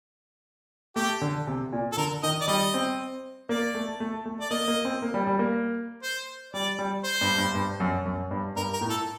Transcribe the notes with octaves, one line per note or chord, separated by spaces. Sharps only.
A3 G4
D3
C3
A#2
A4
D3 A#4
D#3 D#5
D5
G3 D#5
C4
A#3 D5
A3
A3
A3
D5
A#3 D#5
A#3
C4
A#3
G3
G3
A#3
C5
G3 D5
G3
C5
G2
G2
G2
F#2
F#2
G2
G2 A#4
A#4
A2
A4